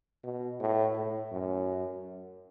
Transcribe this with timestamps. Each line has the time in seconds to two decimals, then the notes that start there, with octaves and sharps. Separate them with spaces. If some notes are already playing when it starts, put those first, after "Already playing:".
0.23 B2
0.60 A2
0.95 A2
1.32 F#2